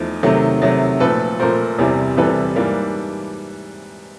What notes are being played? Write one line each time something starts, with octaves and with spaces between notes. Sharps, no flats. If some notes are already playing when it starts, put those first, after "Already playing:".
Already playing: E2 F3 A3 D#4
C3 D#3 F#3 A3
C3 D#3 F#3 A3
A#2 F3 A3 A4 B4
A#2 F3 A3 A#4 C5
E2 C3 E3 G3
E2 C3 E3 G3 A4 B4
G#2 E3 G3 A#3